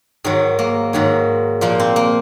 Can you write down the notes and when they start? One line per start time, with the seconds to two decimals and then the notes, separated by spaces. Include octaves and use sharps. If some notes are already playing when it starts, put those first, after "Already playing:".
0.24 G#2 D#3 F#3
0.59 A#3
0.93 G#2 D#3 F#3
1.61 A#2 F3 A#3
1.80 C4
1.96 A#3